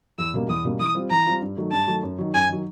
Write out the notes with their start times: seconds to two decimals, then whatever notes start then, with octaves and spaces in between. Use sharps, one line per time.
0.18 E2 E6
0.34 B2 G3 A#3 C#4
0.49 E2 D#6
0.65 B2 G3 A#3 C#4
0.80 E3 D#6
0.95 G3 C4 F4
1.10 E3 A#5
1.26 G3 C4 F4
1.42 G2
1.57 D#3 F#3 A3
1.72 G2 A5
1.88 D#3 F#3 A3
2.03 F#2
2.18 D#3 F#3
2.34 F#2 G#5
2.48 D#3 F#3